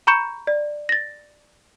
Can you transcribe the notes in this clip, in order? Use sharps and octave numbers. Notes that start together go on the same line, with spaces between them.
A#5 B5 C#6 G6 C#7 E7
D5
A6 A#6